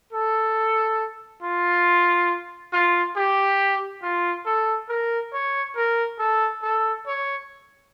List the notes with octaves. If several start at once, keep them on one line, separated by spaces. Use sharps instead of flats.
A4
F4
F4
G4
F4
A4
A#4
C#5
A#4
A4
A4
C#5